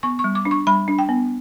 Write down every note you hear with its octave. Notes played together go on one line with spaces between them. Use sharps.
B3 C#6
C#6
G3
D6
D4
C#6
G3 B5
D4
G5
B3